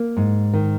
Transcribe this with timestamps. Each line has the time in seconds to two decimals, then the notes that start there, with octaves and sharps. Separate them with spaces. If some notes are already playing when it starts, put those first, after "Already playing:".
Already playing: A#3
0.17 G#2
0.53 D#3